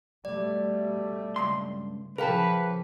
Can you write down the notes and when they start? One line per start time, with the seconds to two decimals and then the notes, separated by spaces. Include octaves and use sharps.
0.25 B2 G3 A3 D5
1.36 C#2 G2 C6
2.18 C#3 F3 G#4 A#4 B4 F5 G5 A5